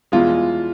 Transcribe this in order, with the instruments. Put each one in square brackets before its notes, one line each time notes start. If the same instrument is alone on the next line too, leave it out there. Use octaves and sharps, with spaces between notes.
[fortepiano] E2 B2 G#3 [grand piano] F4